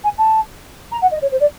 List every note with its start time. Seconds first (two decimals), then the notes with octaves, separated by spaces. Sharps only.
0.03 G#5
0.17 A5
0.91 A#5
1.01 F#5
1.11 D#5
1.21 C#5
1.31 C5
1.40 D5